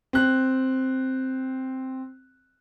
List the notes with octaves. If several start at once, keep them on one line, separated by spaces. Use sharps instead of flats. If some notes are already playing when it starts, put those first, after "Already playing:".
C4 F#6